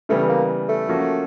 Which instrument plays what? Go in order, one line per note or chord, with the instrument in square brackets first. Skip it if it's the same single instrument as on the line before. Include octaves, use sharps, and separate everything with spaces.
[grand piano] C#3 E3 G3 B3 [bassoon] A3
[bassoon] A#3
A3
[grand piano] F3 A#3 C#4 F#4